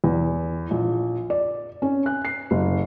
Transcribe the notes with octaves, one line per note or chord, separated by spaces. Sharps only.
E2
A#1
D5
C#4
F#6
C7
F#1